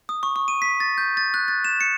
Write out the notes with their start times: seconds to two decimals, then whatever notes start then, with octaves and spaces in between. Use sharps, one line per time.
0.09 D#6
0.23 C#6
0.36 C#6
0.48 D#7
0.62 B6
0.80 A6
0.98 G6
1.17 A6
1.34 F#6
1.48 A6
1.65 E7
1.81 C#7